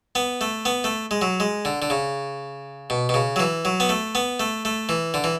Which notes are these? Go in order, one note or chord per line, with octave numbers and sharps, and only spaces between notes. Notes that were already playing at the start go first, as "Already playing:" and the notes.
B3
A3
B3
A3
G#3
F#3
G#3
D3
D3
C#3
B2
B2
C#3
F#3
E3
F#3
B3
A3
B3
A3
A3
E3
D3
E3